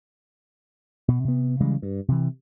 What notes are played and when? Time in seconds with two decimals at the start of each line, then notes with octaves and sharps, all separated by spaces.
1.08 B2
1.24 C3 B3
1.60 C#3 E3 G3 G#3
1.82 G2
2.08 C3 E3